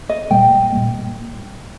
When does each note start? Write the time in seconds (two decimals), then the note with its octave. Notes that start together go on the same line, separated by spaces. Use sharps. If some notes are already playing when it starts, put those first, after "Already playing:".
0.09 D#5
0.31 A#2 G3 A#3 G5
0.72 A#2 G3 A#3